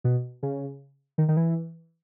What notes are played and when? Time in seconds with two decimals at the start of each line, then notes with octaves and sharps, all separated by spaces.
0.04 B2
0.43 C#3
1.18 D#3
1.28 D#3
1.37 E3